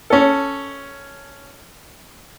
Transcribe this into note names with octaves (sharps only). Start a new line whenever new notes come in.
C#4 A4